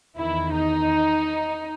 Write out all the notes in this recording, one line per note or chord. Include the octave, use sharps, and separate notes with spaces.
E2 D#3 E4
D#4